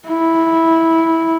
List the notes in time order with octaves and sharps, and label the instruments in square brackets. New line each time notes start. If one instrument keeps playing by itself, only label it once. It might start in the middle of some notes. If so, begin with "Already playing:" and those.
[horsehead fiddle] E4